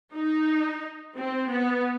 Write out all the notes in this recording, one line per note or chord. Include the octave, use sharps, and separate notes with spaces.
D#4
C4
B3